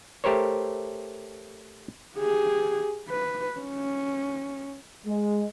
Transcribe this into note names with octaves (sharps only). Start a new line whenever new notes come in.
A3 G4 A#4 C5 C#5
G4 G#4
B4
C#4
G#3